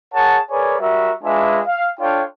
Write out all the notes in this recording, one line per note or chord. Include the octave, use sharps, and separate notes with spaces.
G#4 A#4 C#5 F#5 A5
G#4 A#4 B4 C#5 D5 G#5
G3 F#4 A#4 E5
G#3 D4 F4 B4 E5 G#5
F5
D4 F4 A4 C#5 F5 G5